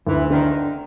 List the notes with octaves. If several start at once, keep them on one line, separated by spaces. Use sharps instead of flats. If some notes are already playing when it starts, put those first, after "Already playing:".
D2 E3
D3 D#3